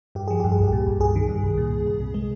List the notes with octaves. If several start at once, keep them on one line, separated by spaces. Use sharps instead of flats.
G2 G4
F3 G#4
G2 G4
G#4
C2
G4
A#2
C2
G2 G#4
D#3
G2
C2
A#2
C2
C2
C3
G#3